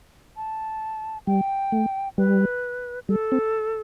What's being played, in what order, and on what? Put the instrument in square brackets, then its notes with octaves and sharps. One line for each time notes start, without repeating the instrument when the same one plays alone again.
[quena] A5
[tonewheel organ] G3 [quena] G5
[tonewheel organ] A3
[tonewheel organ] G3 [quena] B4
[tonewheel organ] G3 [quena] A4
[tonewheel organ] C4